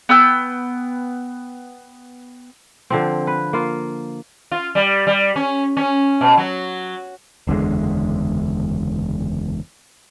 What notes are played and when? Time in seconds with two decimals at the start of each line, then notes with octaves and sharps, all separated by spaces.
0.09 B3 G5 E6
2.90 D3 F3 C4
3.27 B4
3.53 A#3 F4
4.51 F4
4.75 G3
5.07 G3
5.36 C#4
5.77 C#4
6.21 B2
6.37 F#3
7.47 F#1 E2 D3 G#3